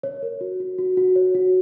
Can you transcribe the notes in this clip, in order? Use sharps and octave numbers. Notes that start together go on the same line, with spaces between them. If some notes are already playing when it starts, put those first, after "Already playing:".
C#5
A#4
F#4
F#4
F#4
F#4
C#5
F#4